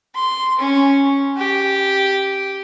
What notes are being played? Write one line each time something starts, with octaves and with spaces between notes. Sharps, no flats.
C6
C#4
G4